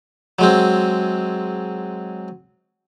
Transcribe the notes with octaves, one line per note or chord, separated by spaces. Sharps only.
F#3 G#3 C4